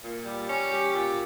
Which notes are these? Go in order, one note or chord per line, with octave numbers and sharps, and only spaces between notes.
A#2
G3
C#4
G4
A#2